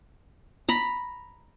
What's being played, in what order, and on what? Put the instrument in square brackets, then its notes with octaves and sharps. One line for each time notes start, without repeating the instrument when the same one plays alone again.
[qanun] A#5 B5